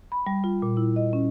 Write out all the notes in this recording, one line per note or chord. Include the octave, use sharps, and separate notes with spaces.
B5
G3
F4
A#2
E4
D#5
C#4